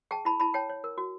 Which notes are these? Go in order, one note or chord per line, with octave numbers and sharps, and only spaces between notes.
G#4 G5 A5
E4 A5 B5
E4 A5 B5
C#5 G5 A5
C#5
A#4
F#4